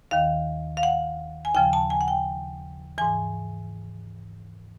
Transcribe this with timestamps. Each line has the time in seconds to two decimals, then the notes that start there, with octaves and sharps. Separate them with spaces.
0.11 D#2 D#3 F5
0.77 F5
0.83 F#5
1.45 G#5
1.54 D#2 C#3 F3 G5
1.73 A5
1.90 G#5
2.01 F#5
2.08 G5
2.98 G#2 E3 G#5